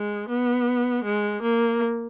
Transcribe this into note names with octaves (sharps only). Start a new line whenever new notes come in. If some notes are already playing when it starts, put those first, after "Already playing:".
Already playing: G#3
B3
G#3
A#3